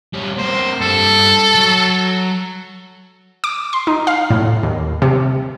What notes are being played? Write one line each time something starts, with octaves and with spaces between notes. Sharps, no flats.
G3 C#4
A#3 C4 C5
G3 D4 A4
F#3
D6
C6
D#4
F5
A2
D#2
C3